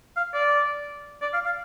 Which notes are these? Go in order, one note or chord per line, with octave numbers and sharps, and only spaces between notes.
F5
D5
D5
F5
F5